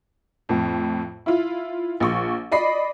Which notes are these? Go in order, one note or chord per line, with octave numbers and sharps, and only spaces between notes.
F2 A2
E4 F4
A#1 C#6
D5 D#5 B5 C7